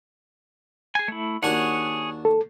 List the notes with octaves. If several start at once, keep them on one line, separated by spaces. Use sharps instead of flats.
G#4 G#5
A3 E4
D#2 D4 F#4 G#4 C#5 F#5
A4